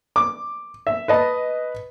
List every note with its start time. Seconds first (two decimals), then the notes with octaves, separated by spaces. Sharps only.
0.16 D6
0.87 E5
1.08 B4 D#5 A5